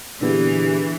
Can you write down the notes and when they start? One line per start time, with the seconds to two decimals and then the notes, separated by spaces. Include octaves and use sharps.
0.21 A#2 D3 E3 A#3 B3 E4 G4 G#4